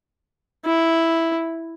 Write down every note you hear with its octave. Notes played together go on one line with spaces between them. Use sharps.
E4